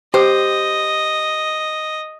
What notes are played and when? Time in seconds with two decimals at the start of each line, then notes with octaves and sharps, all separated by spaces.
0.14 G4 C5 D#5